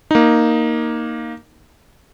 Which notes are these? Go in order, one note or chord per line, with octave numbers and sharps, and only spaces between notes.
A#3 D#4